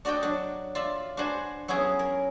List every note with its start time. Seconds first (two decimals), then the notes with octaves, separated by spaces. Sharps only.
0.05 D4 F#4 D5 D#5 G5
0.23 F#3 D4
0.75 F4 D5 E5
1.17 D4 F#4 B4 C5 F#5 G#5
1.68 F#3 B3 C#4 E4 G#4
1.99 A#4